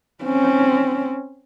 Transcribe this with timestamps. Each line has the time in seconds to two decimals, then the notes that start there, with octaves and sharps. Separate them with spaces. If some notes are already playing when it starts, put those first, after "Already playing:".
0.24 C4 C#4